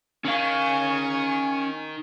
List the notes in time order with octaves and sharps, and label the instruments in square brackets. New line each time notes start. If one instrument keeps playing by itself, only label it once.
[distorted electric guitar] D#3 [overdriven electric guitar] C#4 F5 [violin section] G#5 C#6